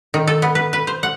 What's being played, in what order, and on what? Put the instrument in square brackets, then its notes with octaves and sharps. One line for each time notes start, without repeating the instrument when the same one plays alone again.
[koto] D#3
A4
B3
B4
B4
C5
F#5